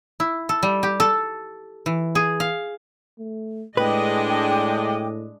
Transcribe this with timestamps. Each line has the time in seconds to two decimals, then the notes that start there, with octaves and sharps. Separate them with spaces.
0.20 E4
0.49 A4
0.63 G3
0.83 G4
1.00 A4
1.86 E3
2.15 G#4
2.40 F5
3.19 A3
3.77 A2 G#3 D4 B4 D#5 G5 D6